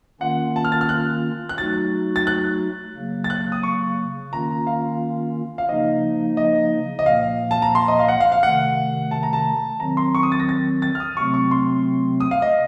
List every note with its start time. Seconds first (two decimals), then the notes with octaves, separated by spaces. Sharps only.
0.21 D#3 A#3 C#4 F4 F#5
0.56 A5
0.65 F6
0.72 A6
0.81 F6
0.89 F#6
1.49 F#6
1.58 F#3 A3 D#4 F#4 A6
2.16 A6
2.27 F#6
2.95 C#3 F#3 A#3
3.24 A6
3.30 F#6
3.52 D#6
3.63 C#6
4.33 D#3 A#3 C#4 F4 A#5
4.67 F5
5.58 F5
5.69 C#3 F3 A#3 D#4 D#5
6.37 D#5
6.99 D#5
7.06 A#2 F3 A#3 F5
7.51 A5
7.62 A#5
7.75 C6
7.88 D#5
7.99 F5
8.08 F#5
8.20 F5
8.32 F5
8.43 C3 D#3 A3 F#5
9.11 A5
9.23 A#5
9.33 A5
9.80 D#3 F#3 C4 A#5
9.97 C6
10.15 C#6
10.23 D#6
10.32 A6
10.40 A#6
10.49 A6
10.82 A6
10.95 F6
11.00 D#6
11.17 C3 F#3 A3 C4 C#6
11.34 C#6
11.51 C6
12.20 D#6
12.31 F5
12.42 D#5